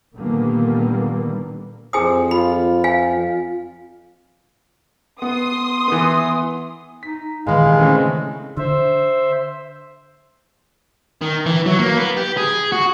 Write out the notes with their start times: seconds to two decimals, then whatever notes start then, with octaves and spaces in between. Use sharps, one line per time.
0.16 A#2 D3 D#3 G3 A#3 B3
1.93 F2 G#4 C5 G#5 D#6
2.31 F4 B5
2.84 F5 G#5
5.22 B3 C6 D#6
5.88 E3 B3
7.03 D#4 B6
7.47 A#2 D#3 E3 G#3 F5 G#5 B5
7.66 C2
7.79 C#3 A3 C4
8.57 D3 C5 E5
11.22 D#3
11.46 E3
11.66 F#3
11.79 A#3
11.97 B3
12.17 G4
12.37 G#4
12.72 F#4